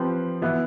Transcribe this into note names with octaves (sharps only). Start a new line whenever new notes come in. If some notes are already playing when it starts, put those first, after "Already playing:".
Already playing: F3 C4 G4 B4
E3 B3 E4